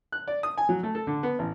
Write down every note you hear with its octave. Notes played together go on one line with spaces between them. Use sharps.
F#6
D5
D#6
G#5
F#3
A3
A4
D3
B3
A1